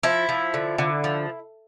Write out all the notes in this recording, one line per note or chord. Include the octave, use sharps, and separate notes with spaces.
F3 E4
F3
D3
D3
F3